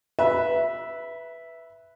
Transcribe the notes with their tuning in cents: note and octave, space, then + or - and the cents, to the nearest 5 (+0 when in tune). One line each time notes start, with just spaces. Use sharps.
B4 +0 E5 +0 B5 -40